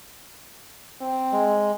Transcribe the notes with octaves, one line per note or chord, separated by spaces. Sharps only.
C4
G#3